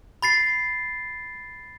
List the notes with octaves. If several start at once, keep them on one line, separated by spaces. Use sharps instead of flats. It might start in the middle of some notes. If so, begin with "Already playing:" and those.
B5 A6 C7